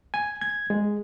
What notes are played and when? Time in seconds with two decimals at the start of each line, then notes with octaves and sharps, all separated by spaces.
0.14 G#5
0.41 G#6
0.70 G#3